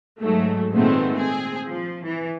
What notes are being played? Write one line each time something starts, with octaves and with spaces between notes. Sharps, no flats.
G#2 F#3 A3
A#2 D#3 G#3 A3 B3 C4
C4 G#4
F3
E3